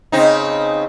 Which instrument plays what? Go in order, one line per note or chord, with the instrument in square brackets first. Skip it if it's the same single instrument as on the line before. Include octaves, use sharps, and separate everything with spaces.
[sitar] C#3 C4 D#4